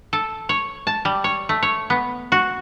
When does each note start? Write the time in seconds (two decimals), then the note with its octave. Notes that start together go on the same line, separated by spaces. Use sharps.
0.13 A4
0.49 C#5
0.87 A5
1.05 G3
1.24 C#5
1.49 A3
1.63 C#5
1.90 B3
2.32 F#4